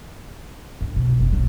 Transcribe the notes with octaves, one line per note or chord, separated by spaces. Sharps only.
D4
B2
F1
B1